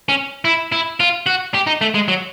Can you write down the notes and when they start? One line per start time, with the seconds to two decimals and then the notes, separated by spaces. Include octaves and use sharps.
0.09 C#4
0.45 E4
0.72 E4
1.00 F4
1.26 F#4
1.54 G4
1.67 D#4
1.81 A3
1.94 G#3
2.08 F#3